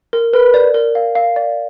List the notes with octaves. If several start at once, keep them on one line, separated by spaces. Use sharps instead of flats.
A#4
A#4 B4
D5
A#4
F5
F5
D5